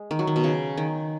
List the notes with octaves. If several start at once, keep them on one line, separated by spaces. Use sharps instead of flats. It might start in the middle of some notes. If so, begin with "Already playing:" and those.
Already playing: G#3
D#3
F#3
D#3
B2
C#3
D#3